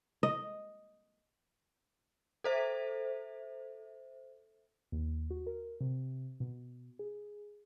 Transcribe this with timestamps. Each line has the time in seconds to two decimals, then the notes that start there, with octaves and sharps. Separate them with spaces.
0.23 D#5
2.44 A4 C5 E5
4.92 D#2
5.30 F#4
5.46 A#4
5.81 C3
6.40 B2
6.99 G#4